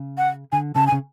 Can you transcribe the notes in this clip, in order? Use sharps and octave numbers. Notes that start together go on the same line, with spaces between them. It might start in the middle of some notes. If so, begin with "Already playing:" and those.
Already playing: C#3
F#5
D3 G#5
C#3 A5
G#5
C#3